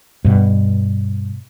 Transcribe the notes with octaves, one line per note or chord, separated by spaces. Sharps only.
G2 B2